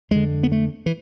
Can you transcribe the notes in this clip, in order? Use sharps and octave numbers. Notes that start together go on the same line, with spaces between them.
F2 D3 G#3
B3
A3
E3